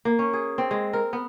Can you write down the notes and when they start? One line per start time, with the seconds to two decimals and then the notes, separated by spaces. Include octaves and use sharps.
0.05 A#3
0.19 C#4
0.33 G#4
0.58 C4
0.71 G#3
0.93 A#4
1.13 B3